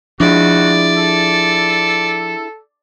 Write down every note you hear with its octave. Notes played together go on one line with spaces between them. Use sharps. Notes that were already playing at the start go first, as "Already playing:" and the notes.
F3 D4 E4 F#4 G#4 D5
A4